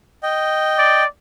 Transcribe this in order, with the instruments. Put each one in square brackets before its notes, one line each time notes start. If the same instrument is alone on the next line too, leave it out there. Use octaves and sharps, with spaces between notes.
[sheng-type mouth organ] D#5 G5
[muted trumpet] D5